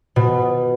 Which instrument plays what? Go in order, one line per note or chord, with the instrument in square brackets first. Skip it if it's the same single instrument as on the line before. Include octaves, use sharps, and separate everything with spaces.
[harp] B2